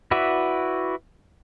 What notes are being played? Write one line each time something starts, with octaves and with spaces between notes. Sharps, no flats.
E4 F#4 B4 D5 E5